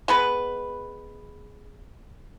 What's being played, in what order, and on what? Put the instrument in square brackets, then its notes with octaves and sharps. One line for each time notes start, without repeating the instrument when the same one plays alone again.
[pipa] G#3 B3 B4